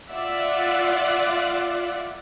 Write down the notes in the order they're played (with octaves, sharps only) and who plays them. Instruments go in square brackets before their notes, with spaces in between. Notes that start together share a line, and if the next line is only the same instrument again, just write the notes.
[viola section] F4 D5 E5 F#5